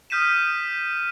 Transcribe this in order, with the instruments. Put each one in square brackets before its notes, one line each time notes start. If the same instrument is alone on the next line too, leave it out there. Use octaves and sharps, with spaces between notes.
[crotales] D#6 F6 G6 B6 D#7 E7